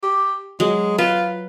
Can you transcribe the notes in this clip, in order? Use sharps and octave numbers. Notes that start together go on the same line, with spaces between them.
G4
F#3 G#3
F4 B4